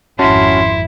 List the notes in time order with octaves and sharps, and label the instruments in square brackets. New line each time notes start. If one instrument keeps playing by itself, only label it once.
[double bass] G#1 F2 [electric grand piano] C#4 F#4 A5 [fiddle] E4 [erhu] C6